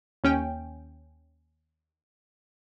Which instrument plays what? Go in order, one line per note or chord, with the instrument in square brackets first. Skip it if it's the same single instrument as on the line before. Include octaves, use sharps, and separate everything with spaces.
[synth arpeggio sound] D#2 C#4 G5